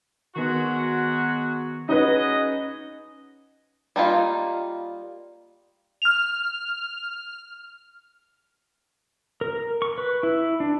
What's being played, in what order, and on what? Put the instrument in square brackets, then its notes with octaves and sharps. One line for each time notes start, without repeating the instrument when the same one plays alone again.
[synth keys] D#3 B3 [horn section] F#3 G#3 F#4
[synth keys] C#4 [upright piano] D#4 B4 [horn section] F#4 G#4 D#5
[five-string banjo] G3 A#3 D#4 F4
[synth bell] F6 F7
[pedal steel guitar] A#4
C#6
B4
E4
D4